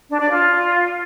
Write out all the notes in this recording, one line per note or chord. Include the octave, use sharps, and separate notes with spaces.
D4
D5
F4